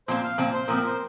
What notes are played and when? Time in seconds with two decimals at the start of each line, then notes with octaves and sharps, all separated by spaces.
0.08 A#2 F3 C4 C5
0.24 F5
0.38 A#2 F3 C4
0.53 C5
0.68 A#2 F3 C4 A#4
0.86 C5